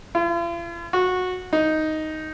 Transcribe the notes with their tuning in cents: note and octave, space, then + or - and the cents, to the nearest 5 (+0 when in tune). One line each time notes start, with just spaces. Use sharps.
F4 -45
F#4 -15
D#4 +5